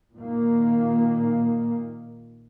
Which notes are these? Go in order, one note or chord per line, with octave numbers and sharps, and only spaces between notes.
A#2 D#3 A#3